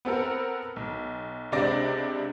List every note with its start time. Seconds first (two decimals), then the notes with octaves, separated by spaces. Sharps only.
0.05 B3 C4 A4 A#4
0.76 B1
1.52 C#2 C3 C4 D4 D5 A#6